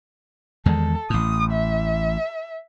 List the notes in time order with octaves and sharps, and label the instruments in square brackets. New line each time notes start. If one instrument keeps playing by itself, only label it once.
[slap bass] E2 D#3 G#3 [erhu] A4
[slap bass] A1 A2 [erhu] D#6
[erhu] E5